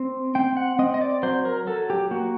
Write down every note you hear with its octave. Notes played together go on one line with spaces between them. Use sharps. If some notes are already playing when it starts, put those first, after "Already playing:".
Already playing: C4
C4 G5
F#5
C4 D#5
D#5
D5
F#3 C5
A#4
F#3 A4
G4
A#3 F#4